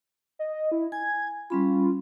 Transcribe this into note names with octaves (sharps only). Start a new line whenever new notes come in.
D#5
E4
G#5 G#6
G3 C#4 F4 B5